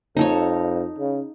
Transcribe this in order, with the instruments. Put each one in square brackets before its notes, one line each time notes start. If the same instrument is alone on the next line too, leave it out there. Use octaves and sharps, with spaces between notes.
[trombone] F2 [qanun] D#4 A4 C#5
[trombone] C#3